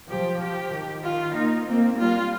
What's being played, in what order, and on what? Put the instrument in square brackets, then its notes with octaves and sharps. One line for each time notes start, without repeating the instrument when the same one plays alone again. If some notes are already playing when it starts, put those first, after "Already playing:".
[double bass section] F3 [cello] G4
[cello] G4
[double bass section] D#3
[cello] F4
[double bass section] A#3 [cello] D#4
[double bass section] A#3 [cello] C4
[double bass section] G3 [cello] F4